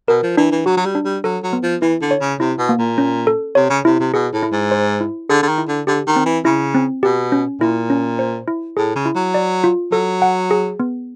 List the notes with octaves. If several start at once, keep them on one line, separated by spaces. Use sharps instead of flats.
B2 A#4
F3
E3 D4
E3
F#3 F#4
F#3
G3
D4
G3
F#3 A4
F#3
B3
F3
E3 E4
D3
C#5
C#3
C3 E4
B2
A#3
A#2
C#4
A4
C3 C#5
C#3
C3 E4
C3
B2 G#4
A2
E4
G#2
C5
E4
D3 G#4
D3
D#3
E4
D3
D3 G4
D#3
C4
E3
C#3 E4
C4
B2 G4
C#4
A#2 E4
C#4
C5
E4
A2 G#4
C#3
E4
F#3
D5
F4
F#3 A4
F#5
G#4
B3